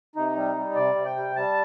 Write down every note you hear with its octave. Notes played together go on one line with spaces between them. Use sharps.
C3 D#4
G3
G3
C3 D5
C3
G5
G3
G3 A5